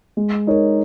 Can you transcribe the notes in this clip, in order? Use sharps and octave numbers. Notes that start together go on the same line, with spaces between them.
G#3
D#4 A#4 C#5